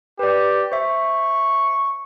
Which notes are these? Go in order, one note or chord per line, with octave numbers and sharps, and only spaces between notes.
G4 B4 D5
C5 E5 C#6